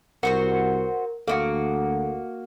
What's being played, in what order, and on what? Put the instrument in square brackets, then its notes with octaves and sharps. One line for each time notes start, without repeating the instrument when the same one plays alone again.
[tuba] C2 [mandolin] F#4 C5 C#6 [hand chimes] A#4
[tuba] D2 [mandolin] A#3 E4 F#4 [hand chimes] A4